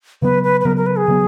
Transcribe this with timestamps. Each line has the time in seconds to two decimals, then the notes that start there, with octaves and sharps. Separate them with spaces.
0.22 C#3 F#3 B3 B4
0.43 B4
0.61 B4
0.65 C#3 F#3 B3 A#4
0.77 A#4
0.86 B4
0.98 G#4
1.08 C#3 F#3 B3